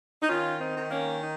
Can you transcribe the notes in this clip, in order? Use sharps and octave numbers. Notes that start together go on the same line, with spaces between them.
D#4
D#3 C#4 F4
C4 D#4
D#3
A#3 C#4
D#4